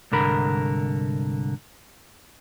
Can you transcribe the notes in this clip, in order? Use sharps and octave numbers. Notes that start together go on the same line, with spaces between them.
C2 G#2 D3 A#4 B5